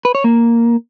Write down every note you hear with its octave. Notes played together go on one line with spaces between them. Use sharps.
B4
C#5
A#3